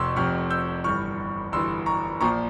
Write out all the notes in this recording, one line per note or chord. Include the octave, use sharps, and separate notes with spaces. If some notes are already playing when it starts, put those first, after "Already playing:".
Already playing: F1 F2 C3 C6 C#6 E6
F1 F2 C3 C#6 F6
E6 G6
G1 G2 E3 C#6 F6
G1 G2 E3 C6 E6
A#5 C#6
A#1 A#2 F3 A#5 C#6